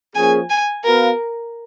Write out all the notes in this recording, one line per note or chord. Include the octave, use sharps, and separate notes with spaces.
F3 A#3 C#4 G#4 G#5
G#5
B3 F#4 A#4 B4 F5